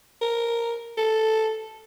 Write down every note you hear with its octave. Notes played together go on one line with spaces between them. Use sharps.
A#4
A4